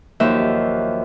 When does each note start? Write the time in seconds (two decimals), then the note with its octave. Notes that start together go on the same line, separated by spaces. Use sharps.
0.20 D#2 F3 F#3 E5